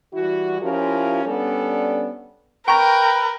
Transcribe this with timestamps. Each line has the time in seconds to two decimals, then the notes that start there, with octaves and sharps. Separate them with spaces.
0.14 E3 G3 E4 F#4
0.61 F3 C#4 E4 F4 G4 A#4
1.25 G3 B3 C#4 D4 A4 D5
2.68 A#4 B4 G5 A#5 C#6